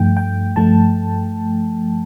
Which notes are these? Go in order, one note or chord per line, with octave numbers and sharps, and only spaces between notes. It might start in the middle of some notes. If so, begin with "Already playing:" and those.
Already playing: G2 F3 A3 G5
G5
G2 F3 A3 A5